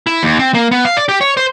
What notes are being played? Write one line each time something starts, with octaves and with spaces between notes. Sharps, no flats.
E4
D#2
C4
A#3
B3
F5
D5
G4
C#5
C5